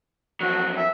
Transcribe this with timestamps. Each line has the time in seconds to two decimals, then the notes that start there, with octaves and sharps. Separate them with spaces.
0.41 F2 F#3 F#4
0.76 E5